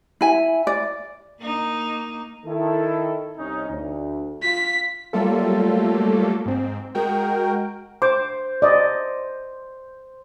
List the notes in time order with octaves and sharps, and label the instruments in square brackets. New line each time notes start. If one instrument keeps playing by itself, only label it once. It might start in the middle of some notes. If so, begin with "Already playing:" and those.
[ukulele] E4 G#5
D5
[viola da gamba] A#3 D#4
[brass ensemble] D#3 E4 A4
C2 C#4 D#4
D2
[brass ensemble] F4 [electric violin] B6
[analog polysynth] F#3 G3 A3 A#3 F4 A4
G#2 C4
G#3 F#4 A#4 G5
[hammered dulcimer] C5 [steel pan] D6
[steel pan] D5 D#5